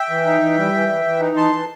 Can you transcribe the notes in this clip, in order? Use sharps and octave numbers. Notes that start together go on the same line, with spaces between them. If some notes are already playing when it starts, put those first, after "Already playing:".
Already playing: E5 G5
E3
D#4
E3
G3
E3
E3
E3
D#4
E3 A5 C6
E3